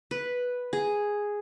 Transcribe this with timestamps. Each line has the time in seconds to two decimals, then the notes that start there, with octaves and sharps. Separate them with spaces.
0.11 B4
0.73 G#4